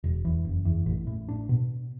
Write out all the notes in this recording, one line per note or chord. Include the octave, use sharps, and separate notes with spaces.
E1
E2
F#1
E2
A1
A2
D4
B2